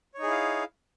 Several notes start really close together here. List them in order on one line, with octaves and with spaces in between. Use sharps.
C#5 D#4 G#4 E4 F5